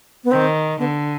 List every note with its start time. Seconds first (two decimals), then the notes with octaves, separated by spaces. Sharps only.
0.24 B3
0.31 D#3 C4
0.79 D3 B3